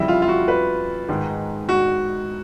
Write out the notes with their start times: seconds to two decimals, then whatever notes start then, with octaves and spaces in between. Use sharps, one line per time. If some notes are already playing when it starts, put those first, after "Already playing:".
Already playing: F2 C#3 E3 G3 E4
0.08 F4
0.22 F4
0.28 F#4
0.48 B4
1.08 G#2 D#3 G#3
1.69 F#4